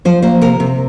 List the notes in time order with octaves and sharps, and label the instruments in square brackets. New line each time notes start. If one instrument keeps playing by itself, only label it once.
[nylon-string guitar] F3 C5
A#3 C5
C3 A#4
C3